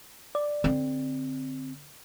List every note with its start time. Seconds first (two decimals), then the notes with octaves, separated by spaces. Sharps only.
0.35 D5
0.64 D3 C4